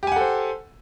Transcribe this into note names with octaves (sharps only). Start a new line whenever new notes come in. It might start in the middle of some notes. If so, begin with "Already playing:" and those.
G4 A4 C5 F#5 G#5